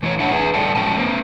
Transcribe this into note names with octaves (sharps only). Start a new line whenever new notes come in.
E3 A3 E4 C#5
D4 E4 C#5 E5 F#5 A5
G#4 B4 G#5
A2 G3 A4 D5 G5 A5
F3 G#3 C#4 G5 A5
A#3 C4